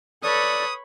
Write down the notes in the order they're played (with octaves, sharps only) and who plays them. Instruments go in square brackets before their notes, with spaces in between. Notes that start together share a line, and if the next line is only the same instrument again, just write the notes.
[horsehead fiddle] A4 B4 [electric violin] C#5 B5 [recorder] D5 [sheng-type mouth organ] D#6